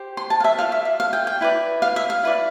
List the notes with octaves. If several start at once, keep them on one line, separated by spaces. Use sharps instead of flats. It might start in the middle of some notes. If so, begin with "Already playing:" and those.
Already playing: G4 C5
C6
A5
F5
E5
F4 A4 D5 F5
E5
E5
F5
G5
G5
E4 B4 D5
F5
E5
F5
E4 B4 D5